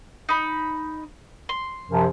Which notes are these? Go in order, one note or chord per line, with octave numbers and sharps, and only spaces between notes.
D#4 B5
C6
F#2 C3 F3